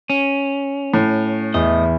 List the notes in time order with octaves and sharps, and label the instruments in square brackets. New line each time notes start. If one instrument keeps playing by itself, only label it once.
[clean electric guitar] C#4
[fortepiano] A2
[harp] E2 [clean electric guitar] D#5